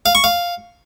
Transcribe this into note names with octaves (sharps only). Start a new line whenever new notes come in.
F5
C#6
F5